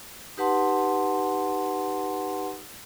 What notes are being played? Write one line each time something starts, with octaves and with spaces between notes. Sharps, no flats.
D#4 G4 B4 F#5 A5 C6